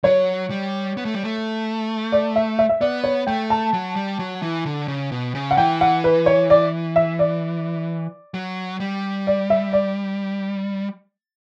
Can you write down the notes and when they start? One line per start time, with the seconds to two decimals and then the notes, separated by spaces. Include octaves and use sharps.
0.04 F#3 C#5
0.50 G3
0.97 B3
1.05 A3
1.15 G3
1.23 A3
2.12 D5
2.36 E5
2.59 E5
2.69 E5
2.81 B3 D5
3.04 C#5
3.27 A3 G5
3.50 A5
3.73 F#3
3.96 G3
4.19 F#3
4.42 E3
4.66 D3
4.88 C#3
5.12 B2
5.35 C#3
5.51 F#5
5.57 E3 G5
5.81 F#5
6.04 B4
6.26 C#5
6.50 D5
6.96 E5
7.19 D5
8.34 F#3
8.80 G3
9.27 D5
9.50 E5
9.73 D5